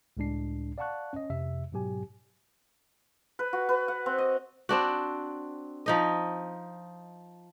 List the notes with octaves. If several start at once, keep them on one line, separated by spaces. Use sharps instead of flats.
C#2 A2 G#3 D4 C7
D5 F5 F#5 A5 C#6 F#6
C#4 D#5
F2 C3 E5
G#2 B2 F#3 G4 G#5
B4
F#4
B4
F#5
C4
D#5
C4 D4 F#4
F3 D#4 D#5